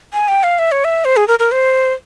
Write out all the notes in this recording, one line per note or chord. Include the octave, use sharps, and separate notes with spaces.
G#5
G5
F5
E5
C#5
E5
C5
G#4
A#4
A#4
C5